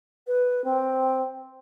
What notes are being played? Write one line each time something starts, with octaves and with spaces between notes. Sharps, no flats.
B4
C4